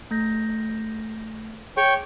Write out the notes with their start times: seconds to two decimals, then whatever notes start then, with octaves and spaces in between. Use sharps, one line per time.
0.11 A3 G6 A#6
1.77 G#4 C#5 G5 C#6